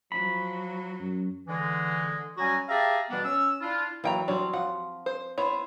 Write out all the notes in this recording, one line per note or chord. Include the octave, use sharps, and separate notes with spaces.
F3 F#3 B5
F#2
D3 E3 G#3
F#3 G3 C#4 F#4 G#5 A#5
G4 G#4 E5 F5 A5 A#5
B2 E3 G3 B3 D4
C#4 E6
D4 E4 F4
E3 F#3 A#3 G5 A#5
F#3 G3 C4 D4 C#5
F3 F#5
C5
B3 E4 C5 C#5